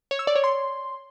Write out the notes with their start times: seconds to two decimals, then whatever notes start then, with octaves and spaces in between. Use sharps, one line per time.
0.11 C#5
0.19 E6
0.27 D5
0.36 C#5
0.44 C6